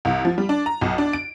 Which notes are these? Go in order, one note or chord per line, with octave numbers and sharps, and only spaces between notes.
C2
F3
G3
D4
A#5
B1
D4
D7